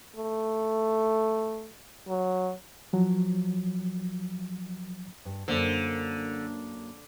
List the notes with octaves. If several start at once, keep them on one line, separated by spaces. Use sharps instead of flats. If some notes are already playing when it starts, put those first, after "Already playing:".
A3
F#3
F3 F#3
G2
F#2 D3 A#3 C5